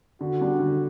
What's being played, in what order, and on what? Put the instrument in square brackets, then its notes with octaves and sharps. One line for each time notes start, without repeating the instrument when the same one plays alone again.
[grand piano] D3 [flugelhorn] F#4
[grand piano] G3 D4
D3